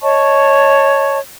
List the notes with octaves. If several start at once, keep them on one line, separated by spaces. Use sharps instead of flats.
C#5 D#5 A5 C#6